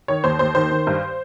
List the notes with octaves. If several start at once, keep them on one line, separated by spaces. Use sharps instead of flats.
D#3 C#5
D#2 C5
D#2 C5
D#3 C5
D#3
G2